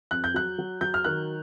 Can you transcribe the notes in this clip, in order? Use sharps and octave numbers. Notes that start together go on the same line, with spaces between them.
F2 F#6
G6
F#3 F#6
F#3
F#3 G6
F6
D#3 F#6